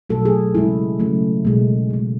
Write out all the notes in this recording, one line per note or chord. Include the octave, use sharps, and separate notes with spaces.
B2 F#3 A3 A4
G#4
C#3 G#3 E4
C#3 F#3 A3
B2 G#3
C#3 G#3